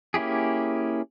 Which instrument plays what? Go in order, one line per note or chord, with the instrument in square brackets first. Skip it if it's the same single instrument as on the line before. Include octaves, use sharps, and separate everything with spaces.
[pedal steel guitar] A#3 C#4 E4 G4 G#4